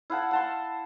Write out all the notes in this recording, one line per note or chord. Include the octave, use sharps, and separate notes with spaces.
E4 F5 F#5 A5
F#5 A5 C6